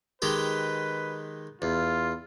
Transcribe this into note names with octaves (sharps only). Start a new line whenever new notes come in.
D#3 G#3 G4 B4
E2 F4